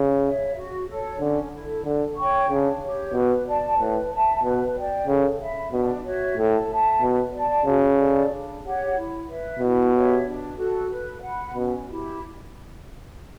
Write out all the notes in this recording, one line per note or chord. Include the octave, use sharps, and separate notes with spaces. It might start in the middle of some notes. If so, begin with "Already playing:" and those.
Already playing: C#3
C#5 E5
F#4
A4 C#5
D3 C#4
E4 A4
D3 A4
C#5 G5 C#6
C#3 D4
G4 C#5
B2 B4
D5 A5
A2 B4
E5 A5
B2 B4
D5 G5
C#3 A4
E5 B5
B2 D4
F#4 C#5 E5
A2 A4
E5 A5
B2 B4
D5 A5
C#3 F#4
A4 D5
D4
G4 C#5 F#5
E4
B4 E5
B2 E4
G4 C#5 E5
D4
F#4 A4
B4
F#5 B5
B2 C#4
E4 G4